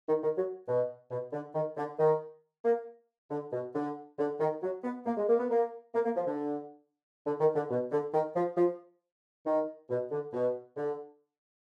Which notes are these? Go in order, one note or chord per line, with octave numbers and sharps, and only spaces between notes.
D#3
D#3
F#3
B2
B2
D3
D#3
D3
D#3
A#3
D3
B2
D3
D3
D#3
F#3
B3
A#3
G#3
A#3
B3
A#3
A#3
A#3
F3
D3
D3
D#3
D3
B2
D3
D#3
F3
F3
D#3
B2
D3
B2
D3